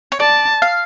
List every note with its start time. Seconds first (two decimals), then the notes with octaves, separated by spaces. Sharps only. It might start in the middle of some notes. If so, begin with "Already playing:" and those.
0.12 C#5
0.20 D5 A5
0.62 F5